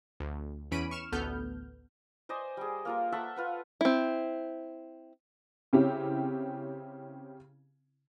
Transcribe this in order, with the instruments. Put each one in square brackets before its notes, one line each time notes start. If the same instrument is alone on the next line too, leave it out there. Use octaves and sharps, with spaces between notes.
[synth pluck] D2
E2 E3 C#4 B5 D7 D#7
C#6 F6 E7
A1 D2 B3 A4 F6 G6
[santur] C5 D5 D#5 G#5
G3 G#4
A#3 F4 A#4
A4 E5 F#5 C#6
F4 B4 F#5
[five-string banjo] C4 E4
[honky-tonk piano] C#3 C4 C#4 E4 G4